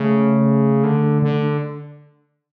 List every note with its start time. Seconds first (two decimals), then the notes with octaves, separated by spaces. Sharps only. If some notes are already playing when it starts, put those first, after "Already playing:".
Already playing: C#3 A3
0.84 D3
1.22 D3